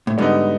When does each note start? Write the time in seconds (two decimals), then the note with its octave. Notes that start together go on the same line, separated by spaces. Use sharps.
0.07 A2
0.18 G#2 D3 G3 B3 D#4